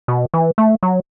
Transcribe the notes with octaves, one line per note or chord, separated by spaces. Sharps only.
B2
E3
A3
F#3